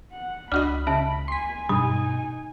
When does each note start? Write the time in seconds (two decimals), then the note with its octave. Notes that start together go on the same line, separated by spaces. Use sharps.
0.12 F#5
0.52 C#2 D4 F#4 D#5 B5 F6
0.87 C#3 E5 A5
1.28 G#5 C6 B6
1.69 G2 B2 D#4 G#5 B5 D#6